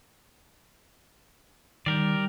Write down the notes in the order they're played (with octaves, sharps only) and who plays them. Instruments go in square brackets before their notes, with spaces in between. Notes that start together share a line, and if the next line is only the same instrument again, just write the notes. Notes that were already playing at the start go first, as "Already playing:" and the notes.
[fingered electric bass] D#3 [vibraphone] G3 [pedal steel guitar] G4 A#4 D5